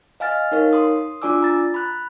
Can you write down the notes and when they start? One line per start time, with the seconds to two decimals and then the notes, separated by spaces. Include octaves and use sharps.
0.20 D#5 F5 G#5 F6 A6
0.52 D#4 A#4 C#5 F5
0.73 C6 D#6
1.22 D4 F4 D5 G#5 D6 E6
1.43 A#5 A6
1.74 B5 F#6